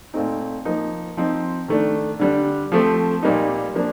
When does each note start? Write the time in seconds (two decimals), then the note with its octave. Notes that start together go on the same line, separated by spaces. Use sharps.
0.14 A#2 A3 C4 D#4
0.65 F3 A#3 D#4
1.17 F3 C4 D#4
1.68 D#3 A3 D4
2.19 D3 G3 D4
2.72 F3 A3 C4
3.23 A#2 G3 A#3 D#4
3.75 F3 A#3 D4